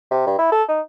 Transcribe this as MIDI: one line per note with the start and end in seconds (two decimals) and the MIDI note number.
0.11 0.25 48
0.27 0.35 43
0.39 0.51 64
0.52 0.63 69
0.68 0.80 63